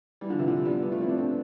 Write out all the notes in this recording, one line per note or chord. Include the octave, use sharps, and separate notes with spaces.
E3 G3
D3 F3
C3 E3
D3 F3
G3 B3
G3 B3
F3 A3
C4 E4
B3 D4
A3 C4